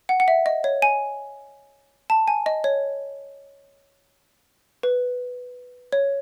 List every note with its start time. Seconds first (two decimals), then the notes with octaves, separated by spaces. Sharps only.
0.09 F#5
0.20 F#5
0.28 E5
0.46 D#5
0.64 C#5
0.82 G#5
2.10 A5
2.28 G#5
2.46 D#5
2.64 C#5
4.83 B4
5.92 C#5